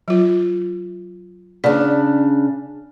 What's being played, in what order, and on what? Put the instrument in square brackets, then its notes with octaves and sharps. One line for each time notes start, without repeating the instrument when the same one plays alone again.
[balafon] F#3 F4
[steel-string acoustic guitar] C#3 D4 [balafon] D5